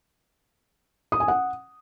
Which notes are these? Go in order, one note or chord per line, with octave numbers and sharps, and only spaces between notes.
D#6
G#5
F#5